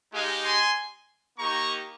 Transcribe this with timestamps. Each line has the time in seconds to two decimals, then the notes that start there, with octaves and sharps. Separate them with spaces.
0.13 G#3 D#4 G4 F5 G#5
0.44 G#5 C6
1.37 A#3 D#4 G4 A#5 C#6